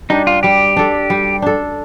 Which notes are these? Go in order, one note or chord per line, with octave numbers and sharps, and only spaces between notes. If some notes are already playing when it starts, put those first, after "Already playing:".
G3 D4 D#4
F4
G3 G4
D4 A4
G3
D4 A4